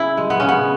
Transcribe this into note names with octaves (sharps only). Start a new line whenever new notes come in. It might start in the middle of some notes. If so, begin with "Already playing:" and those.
Already playing: C#3 E4 G#4
G#3
B3
C#3 C#4
B3